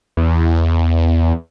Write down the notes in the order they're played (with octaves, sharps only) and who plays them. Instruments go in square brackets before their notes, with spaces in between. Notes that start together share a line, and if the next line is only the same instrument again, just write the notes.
[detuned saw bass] E2